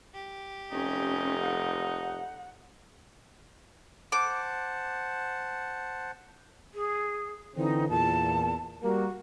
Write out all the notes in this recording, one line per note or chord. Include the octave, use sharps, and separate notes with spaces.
G4
F1 C#4 D#4
F#5
C5 F#5 A5 D6
G#4
D3 E3 C4 D#4
E2 A#2 A5
G3 A#3 F#4